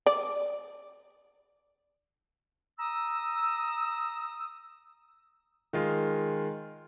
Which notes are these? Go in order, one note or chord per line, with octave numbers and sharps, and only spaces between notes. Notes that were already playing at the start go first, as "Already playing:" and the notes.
D5
A#5 D#6 E6
D#3 G#3 F4